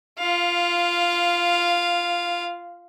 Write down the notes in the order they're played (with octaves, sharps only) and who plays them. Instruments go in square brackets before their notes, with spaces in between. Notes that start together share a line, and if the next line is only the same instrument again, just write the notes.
[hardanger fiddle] F4 F5